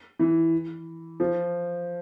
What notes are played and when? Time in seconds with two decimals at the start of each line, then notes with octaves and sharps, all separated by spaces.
0.19 E3
1.20 F3